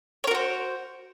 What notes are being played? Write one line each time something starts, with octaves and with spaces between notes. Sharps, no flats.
F#4 A#4 C5 C#5